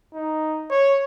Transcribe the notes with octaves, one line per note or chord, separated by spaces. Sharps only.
D#4
C#5